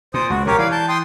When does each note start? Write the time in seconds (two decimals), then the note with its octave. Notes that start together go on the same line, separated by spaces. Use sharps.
0.14 A#2 C5 D#6
0.30 C#2 F#4
0.47 A#1 C3 G4 A#4 C#5
0.58 E3 D5 F5
0.72 A5 G6
0.89 G5 C6 D#6